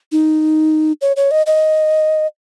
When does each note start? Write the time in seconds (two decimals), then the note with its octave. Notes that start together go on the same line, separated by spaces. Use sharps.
0.12 D#4
1.01 C#5
1.16 C#5
1.31 D#5
1.46 D#5